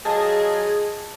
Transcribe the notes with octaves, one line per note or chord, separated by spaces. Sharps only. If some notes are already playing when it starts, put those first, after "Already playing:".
F#3 F4 G#4 D#5 A5